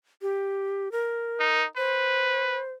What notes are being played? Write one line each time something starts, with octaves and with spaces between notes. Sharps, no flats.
G4
A#4
D#4
B4 C5